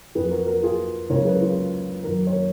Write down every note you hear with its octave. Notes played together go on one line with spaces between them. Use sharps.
F2 F3 G#4 B4
F#4 A#4
F#4 A#4
F4 G#4
C#2 C#3 F#3 A#4 C#5
G#4 B4
F4 G#4
F#2 D#3 F#3 F#4 A#4
A#4 C#5